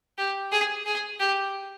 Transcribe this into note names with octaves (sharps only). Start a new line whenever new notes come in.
G4
G#4
G#4
G4